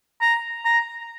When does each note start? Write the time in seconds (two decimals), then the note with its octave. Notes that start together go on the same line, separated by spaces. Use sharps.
0.21 A#5
0.65 A#5